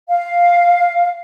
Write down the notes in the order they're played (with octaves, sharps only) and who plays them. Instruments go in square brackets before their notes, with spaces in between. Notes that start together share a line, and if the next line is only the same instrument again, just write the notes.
[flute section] F5